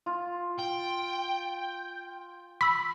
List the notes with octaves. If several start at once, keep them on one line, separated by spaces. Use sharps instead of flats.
F4
G5
B5 E6 B6